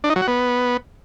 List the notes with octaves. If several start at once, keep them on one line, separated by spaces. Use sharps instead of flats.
D4
D#4
F#3
F#4
B3